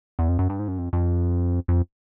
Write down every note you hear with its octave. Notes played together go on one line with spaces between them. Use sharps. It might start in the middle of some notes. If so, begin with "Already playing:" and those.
E2
F2
F#2
G2
G#2
F#2
F2
F2
F2